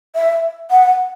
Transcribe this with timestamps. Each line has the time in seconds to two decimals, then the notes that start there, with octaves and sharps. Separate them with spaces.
0.16 E5
0.71 F#5